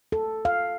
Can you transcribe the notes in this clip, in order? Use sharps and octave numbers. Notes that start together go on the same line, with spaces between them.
A4
F5